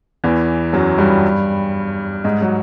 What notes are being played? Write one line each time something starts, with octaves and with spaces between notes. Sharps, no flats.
E2 E3
F#2 F#3
G2 G3
G#2 G#3
F#3